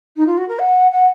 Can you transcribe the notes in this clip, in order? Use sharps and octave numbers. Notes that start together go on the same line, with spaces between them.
D#4
F4
F#4
A#4
F#5
F#5